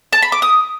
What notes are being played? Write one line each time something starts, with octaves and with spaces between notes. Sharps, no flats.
A5
B5
D6
D#6